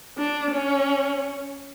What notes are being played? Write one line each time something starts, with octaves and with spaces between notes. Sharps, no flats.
D4
C#4